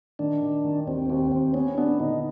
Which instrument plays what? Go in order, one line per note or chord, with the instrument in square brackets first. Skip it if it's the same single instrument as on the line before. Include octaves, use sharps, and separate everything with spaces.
[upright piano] D#3 [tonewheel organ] D4
[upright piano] D#3
D#3
[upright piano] D#2 [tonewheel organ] C4
[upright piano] D#2 [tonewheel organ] C4
[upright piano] D#2 [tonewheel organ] C4
[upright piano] B3 [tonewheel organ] C#4
[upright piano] B3 [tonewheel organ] D4
[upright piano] D3 [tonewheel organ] D#4